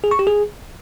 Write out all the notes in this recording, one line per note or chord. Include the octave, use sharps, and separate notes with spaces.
G#4
C#6
G4
G#4